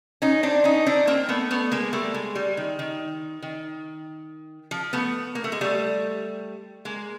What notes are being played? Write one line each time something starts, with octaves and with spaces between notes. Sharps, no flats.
C#4 D#4
C4 D4
C#4 D#4
C4 D4
A#3 C4
A3 B3
A3 B3
G#3 A#3
G3 A3
G#3
G3
D#3
D#3
D#3
F3
A3 B3
A#3
A3
G#3
G3 A3
G#3 A#3